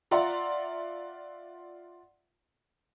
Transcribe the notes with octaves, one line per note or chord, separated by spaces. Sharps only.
F4 D5 E5 F#5 A#5 C6